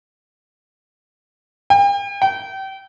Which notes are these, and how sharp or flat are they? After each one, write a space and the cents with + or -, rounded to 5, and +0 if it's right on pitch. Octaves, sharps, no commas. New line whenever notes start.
G5 +40
G5 -30